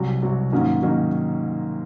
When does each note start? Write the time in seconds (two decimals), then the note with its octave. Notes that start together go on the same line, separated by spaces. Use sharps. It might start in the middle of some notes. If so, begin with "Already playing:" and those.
Already playing: C2 C3 F#3
0.22 C2 C3 F#3
0.52 G#2 D#3 F#3 A#3 C#4
0.82 D#3 F#3 A#3 C#4